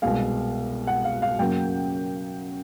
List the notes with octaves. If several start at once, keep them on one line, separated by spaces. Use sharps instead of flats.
C2 B2 G#3 F5
F#5
F5
F5
F#2 C#3 F#3 A#3 G5